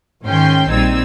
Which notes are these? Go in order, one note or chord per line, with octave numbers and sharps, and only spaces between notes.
G#2 D#3 C#4 G5 C6 G6
A#1 G3 C4 D#4 E6 G#6